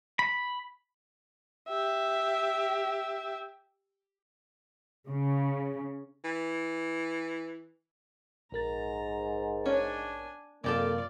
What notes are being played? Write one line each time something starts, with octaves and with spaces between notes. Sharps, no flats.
B5
G4 E5
C#3
E3
A#1 G#2 A#4 A#5 A6
C#4 D4 G#5
F#2 C3 G#3 A#3 F4 G4 A4 D5